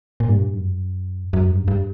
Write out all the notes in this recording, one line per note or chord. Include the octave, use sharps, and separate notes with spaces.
A#2
G2
F#2
F#2
G2
G2